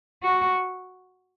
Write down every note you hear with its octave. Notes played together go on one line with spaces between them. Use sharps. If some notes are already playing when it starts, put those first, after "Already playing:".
F#4